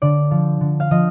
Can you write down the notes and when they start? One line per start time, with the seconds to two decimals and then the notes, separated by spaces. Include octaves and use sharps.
0.02 D3 D5
0.31 F3
0.61 D3
0.80 F5
0.91 F3 D#5